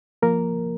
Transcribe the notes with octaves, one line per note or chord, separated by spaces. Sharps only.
F3 A#3 A#4